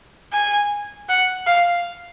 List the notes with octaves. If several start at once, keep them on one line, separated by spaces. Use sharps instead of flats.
G#5
F#5
F5